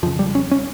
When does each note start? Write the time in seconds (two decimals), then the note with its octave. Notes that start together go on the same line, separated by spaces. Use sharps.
0.03 F2 F3
0.06 C#3
0.19 G3
0.35 C#4
0.51 C#4